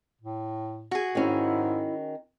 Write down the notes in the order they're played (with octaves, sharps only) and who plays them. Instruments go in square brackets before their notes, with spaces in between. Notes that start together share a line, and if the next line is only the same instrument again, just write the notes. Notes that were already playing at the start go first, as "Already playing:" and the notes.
[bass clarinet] A2
[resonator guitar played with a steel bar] F#4 G#4
[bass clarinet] G#2 [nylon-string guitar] D#3 C#4 [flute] E4